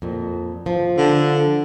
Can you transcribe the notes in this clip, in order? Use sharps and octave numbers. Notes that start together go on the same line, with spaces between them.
F2 A#2
F3
D3